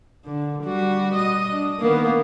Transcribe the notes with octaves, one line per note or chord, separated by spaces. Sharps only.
D3
G3 F#4
D#5
D4
D#3 A#3 B3